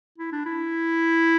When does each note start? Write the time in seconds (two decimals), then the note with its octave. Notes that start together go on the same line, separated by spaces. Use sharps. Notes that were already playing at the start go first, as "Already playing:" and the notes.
0.18 E4
0.32 D4
0.46 E4